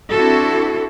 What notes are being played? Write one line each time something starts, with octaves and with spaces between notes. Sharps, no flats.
C4 D4 E4 F#4 A4